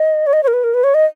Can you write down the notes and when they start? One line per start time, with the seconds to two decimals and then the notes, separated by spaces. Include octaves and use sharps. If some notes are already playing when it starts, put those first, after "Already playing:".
Already playing: D#5
0.27 C#5
0.33 D#5
0.43 C#5
0.48 A#4
0.53 B4
0.64 A#4
0.74 B4
0.84 C#5
0.94 D#5